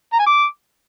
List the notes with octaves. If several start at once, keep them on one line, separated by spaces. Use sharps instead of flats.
A#5
G#5
D6